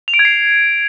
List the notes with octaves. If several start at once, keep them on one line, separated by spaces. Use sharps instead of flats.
F7
D7
G#6
C7